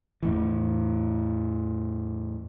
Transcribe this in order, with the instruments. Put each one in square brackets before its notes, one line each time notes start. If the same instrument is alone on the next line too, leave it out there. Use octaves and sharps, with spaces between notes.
[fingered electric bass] E2 A2 E3